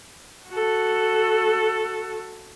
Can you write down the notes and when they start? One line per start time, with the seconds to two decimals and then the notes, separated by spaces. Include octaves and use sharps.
0.49 F#4 A4